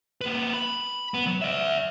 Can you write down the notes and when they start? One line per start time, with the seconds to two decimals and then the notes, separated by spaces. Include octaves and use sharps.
0.21 A#3 B4
0.54 B5
1.14 B3
1.27 F#3
1.42 D5 E5